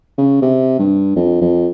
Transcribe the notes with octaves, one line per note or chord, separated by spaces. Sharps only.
C#3
C3
G2
F2
F2